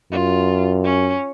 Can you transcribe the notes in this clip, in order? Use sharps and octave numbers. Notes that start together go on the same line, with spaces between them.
F#2 F4
C#4